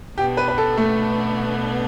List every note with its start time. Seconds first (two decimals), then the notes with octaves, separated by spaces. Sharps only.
0.17 B2 B3 D4 G4
0.37 B4
0.48 B4
0.58 A4
0.77 A3